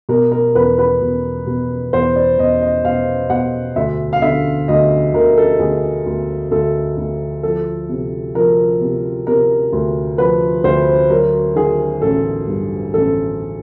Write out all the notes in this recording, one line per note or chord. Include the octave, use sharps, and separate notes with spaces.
B2 A#4
A#4
E2 B4
B4
B2
B2
E2 C5
D5
E2 D#5
D#5
B2 F5
B2 F#5
D2 E5
F5
D3 E5
D2 D#5
D2 A#4
A4
D2 G#4
D2
D2 A4
D2
F3 A4
C3
F3 A#4
C3
C3 A#4
D2
F3 B4
D2 C5
F#3 A#4
D#3 G#4
A1 A4
G2
A1 A4